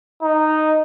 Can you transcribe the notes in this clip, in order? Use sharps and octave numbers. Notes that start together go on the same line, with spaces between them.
D#4